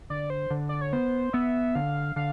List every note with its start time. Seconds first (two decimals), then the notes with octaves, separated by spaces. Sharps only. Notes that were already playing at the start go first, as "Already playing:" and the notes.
0.10 D3 D5
0.30 C5
0.51 D3
0.69 D5
0.81 C#5
0.93 B3 C5
1.33 B3 E5
1.75 D3 F5
2.16 D3 F5